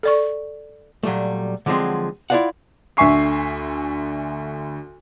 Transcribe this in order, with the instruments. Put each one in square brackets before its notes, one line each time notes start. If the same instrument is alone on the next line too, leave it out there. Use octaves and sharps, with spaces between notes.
[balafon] A4 D5 C#6
[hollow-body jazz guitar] A#2 F#3 G3 A3
D3 F3 F#3 G#3 C4
E4 F4 G#4 D5 F5 F#5
[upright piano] D2 D3 E5 G#5 C#6 C7